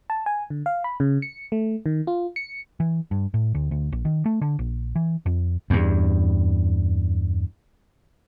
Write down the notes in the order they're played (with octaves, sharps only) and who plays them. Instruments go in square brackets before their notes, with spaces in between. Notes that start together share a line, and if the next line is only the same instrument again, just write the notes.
[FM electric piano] A5
G#5
D3
F5
B5
C#3
C#7
A3
D#3
F4
C#7
[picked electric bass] E3
G2
A2
D2
D2
A#1
D#3
A3
D3
A#1
E3
F2
[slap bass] E2 G2